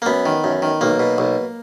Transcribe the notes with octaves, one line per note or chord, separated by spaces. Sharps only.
A#3
F#2 B3
D#3
F#2
D#3
B1 A#3
B2
B1